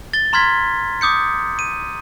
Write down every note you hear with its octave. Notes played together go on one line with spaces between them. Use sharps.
A6 G7
A#5 C6 F6 G#6 B6 G7
D6 D#6 G6 C#7
D#7